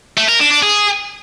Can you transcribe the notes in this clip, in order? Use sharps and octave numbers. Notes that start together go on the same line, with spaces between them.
A3
A#4
D4
D4
G#4